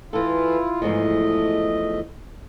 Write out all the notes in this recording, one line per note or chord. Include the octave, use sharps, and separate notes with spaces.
E3 E4 F4 A4
E2 G#2 F3 A3 D#5